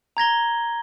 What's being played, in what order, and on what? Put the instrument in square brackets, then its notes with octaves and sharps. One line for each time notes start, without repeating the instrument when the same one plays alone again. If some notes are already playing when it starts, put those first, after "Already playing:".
[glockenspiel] A#5 G#6 A#6 G7